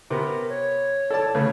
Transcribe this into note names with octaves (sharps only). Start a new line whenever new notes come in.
C3 B3 A#4
C#5
A4 D5 A5
C#3 A3 B3 C#5